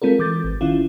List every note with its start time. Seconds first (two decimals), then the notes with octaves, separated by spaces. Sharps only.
0.02 G#3 C4 F4 A4 A#4
0.19 E3 D6 G6 A6
0.44 G#1
0.61 D#3 C#4 E4 F4